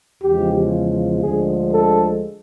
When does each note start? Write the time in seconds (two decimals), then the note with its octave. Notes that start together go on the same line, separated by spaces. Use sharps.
0.23 E2 C#3 F3 G#3 G4
1.22 D2 D3 F3 G#3 G#4
1.72 A4